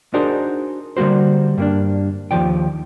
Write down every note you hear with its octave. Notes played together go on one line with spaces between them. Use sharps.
D4 D#4 F#4 G#4 A#4 C5
D3 G3 A#3 F#4 C5
G2 A#3 D4
D#2 F3 D5 G5